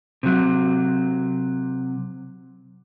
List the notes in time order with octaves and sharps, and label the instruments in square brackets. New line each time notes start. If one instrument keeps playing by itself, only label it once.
[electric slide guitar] C3 F#3